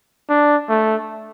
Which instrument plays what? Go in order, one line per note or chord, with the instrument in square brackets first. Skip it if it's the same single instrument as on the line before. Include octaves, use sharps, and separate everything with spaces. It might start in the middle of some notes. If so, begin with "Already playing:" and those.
[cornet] D4
A3